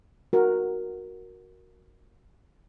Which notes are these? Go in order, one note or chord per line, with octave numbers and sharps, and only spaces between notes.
F#4 A#4